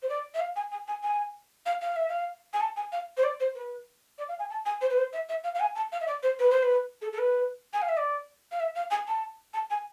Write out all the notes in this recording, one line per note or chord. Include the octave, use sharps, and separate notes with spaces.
C5
D5
E5
F5
G#5
G#5
G#5
G#5
F5
F5
E5
F5
G#5
A5
G#5
F5
C5
D5
C5
B4
D5
F5
G#5
A5
G#5
C5
B4
C5
E5
E5
F5
F5
G#5
A5
F5
E5
D5
C5
B4
C5
B4
A4
A4
B4
G#5
F5
E5
D5
F5
E5
F5
G#5
A5
A5
G#5